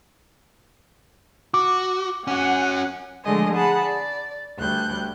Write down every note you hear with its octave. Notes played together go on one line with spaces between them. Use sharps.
F#4 D6
C#4 F#4 F#5 G#5
D3 F3 G#3 A3 D#5 G#5
G#4 F#5 A5 B5
D5
D2 G3 F#6 G6